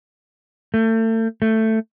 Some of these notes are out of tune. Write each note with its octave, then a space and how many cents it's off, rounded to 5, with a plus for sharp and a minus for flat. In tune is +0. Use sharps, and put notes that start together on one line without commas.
A3 +35
A3 +10